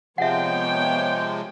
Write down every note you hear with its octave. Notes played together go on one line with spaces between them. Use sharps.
C3 F3 G#3 B3 C#5 E5 F#5 G5